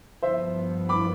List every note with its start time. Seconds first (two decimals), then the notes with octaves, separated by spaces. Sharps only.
0.22 G2 F3 B3 C5 E5
0.89 B5 D6